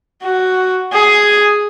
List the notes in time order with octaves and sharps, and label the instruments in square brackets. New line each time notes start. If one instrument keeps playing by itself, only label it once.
[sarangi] F#4
G#4